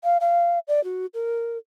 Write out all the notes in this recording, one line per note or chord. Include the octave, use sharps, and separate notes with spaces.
F5
F5
D5
F#4
A#4